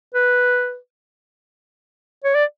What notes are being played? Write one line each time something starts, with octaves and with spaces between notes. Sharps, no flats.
B4
C#5
D5